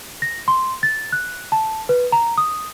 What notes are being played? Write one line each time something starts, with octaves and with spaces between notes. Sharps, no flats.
A#6
C6
A6
F#6
A5
B4
A#5
D#6